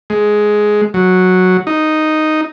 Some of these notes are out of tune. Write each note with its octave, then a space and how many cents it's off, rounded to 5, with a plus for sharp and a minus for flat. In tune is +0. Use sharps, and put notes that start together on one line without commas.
G#3 +10
F#3 -5
D#4 -5